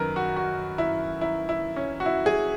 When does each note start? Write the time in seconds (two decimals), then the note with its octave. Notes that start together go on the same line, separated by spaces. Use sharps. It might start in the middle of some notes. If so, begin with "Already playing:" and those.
Already playing: F#2 D#3 A#4 B4
0.16 F#4
0.36 F#4
0.78 E4
1.21 E4
1.49 E4
1.76 C#4
2.00 F#4
2.06 E4
2.26 G#4